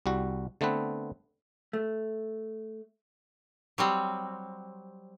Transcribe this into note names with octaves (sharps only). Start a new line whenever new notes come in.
C2 G3 F#4
D3 A3 B3 C4 B4
A3
F#3 G3 C4